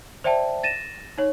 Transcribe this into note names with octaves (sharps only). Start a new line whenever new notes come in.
C5 D5 E5 G5 A5
A6 A#6 D#7 E7
D#4 C#5